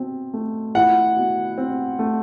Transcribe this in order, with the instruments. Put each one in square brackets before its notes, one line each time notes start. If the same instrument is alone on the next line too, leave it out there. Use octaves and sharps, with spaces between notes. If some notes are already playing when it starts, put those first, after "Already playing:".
Already playing: [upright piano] B2 C4
A3
[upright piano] E4 [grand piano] F#5
[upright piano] B2
C4
A3